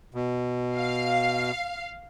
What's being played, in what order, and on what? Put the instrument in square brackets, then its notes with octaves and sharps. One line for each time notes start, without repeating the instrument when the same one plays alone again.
[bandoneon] B2
[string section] F5